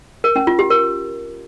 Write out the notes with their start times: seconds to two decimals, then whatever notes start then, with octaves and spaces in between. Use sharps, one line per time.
0.24 A#4
0.36 C#4
0.47 F4
0.59 G4
0.70 A#4